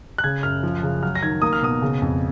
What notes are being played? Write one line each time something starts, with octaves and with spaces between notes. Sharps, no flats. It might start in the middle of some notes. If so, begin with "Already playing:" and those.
F#6
C#3 G#6
F#2 F6
F3
C#3
F#3 F6
A#6
D#3 G#6
A#3 D#6
F6
B2 D#6
C#3
F2